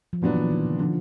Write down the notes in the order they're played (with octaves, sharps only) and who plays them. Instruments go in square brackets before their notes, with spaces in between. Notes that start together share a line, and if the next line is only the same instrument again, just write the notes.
[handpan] F3
[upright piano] A#2 F#3 B3 D4 [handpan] E3
[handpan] E3
D#3
C#3
[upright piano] D3 [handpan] F3